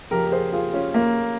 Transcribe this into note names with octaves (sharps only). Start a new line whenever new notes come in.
F2 C#3 F3 G4 A#4
A#4
G#4 C5
F4 G#4
C#4 F4
A#3